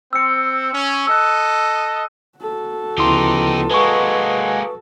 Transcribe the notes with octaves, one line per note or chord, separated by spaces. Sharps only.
C4 E6 C#7
C#4
A4 D#5 E6 F#6
F#4 A4
D2 C#3 F3 B3 D#4 E4 G4 C6
G#3 A#3 B4 D#5 F#5 G#5 C#6